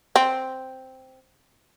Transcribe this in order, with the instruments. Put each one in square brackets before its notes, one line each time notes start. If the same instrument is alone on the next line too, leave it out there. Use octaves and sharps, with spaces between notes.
[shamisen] C4